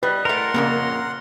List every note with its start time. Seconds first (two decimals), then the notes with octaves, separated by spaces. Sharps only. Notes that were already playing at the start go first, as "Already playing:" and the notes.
0.03 G3 B4 D#5
0.25 A2 A3 A#4 F#5 C6
0.54 F2 A#2 C#3 A#3